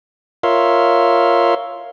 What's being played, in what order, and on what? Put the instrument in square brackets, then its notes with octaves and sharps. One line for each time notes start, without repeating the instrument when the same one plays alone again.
[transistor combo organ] F4 A#4 C#5 E5 F5 C6